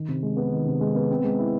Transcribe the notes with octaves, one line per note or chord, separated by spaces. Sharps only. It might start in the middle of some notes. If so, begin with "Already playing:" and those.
Already playing: D#3
C3
G#3
B3
D#3
C3
G#3
B3
C4
G#3
E4